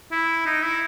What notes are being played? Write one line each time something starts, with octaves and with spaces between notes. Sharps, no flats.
E4
D#4
E4